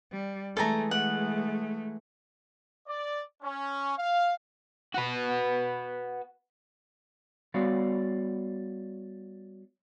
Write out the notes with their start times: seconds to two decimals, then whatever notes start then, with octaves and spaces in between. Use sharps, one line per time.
0.12 G3
0.57 E3 G#3 A3 A4 G#5 A#5
0.91 A3 F#5
2.87 D5
3.42 C#4
3.97 F5
4.95 F#4 B4
7.54 G3 B3 F#4 C#5 D5 F5